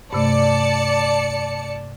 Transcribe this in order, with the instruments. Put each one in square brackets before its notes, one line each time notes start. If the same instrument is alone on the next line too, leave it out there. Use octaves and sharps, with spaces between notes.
[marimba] G2 C3 A3 [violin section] D5 A5 C#7